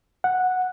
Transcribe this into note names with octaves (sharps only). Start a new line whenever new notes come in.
F#5